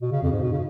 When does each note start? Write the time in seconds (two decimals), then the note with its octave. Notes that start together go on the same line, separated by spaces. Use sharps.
0.02 B2
0.12 C#3
0.22 F2
0.32 G#2
0.42 B2
0.53 C#3